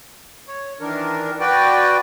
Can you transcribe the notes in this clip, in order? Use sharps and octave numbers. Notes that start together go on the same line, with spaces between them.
C#5
D#3 E3 D4 A#4
F#4 B4 D5 G5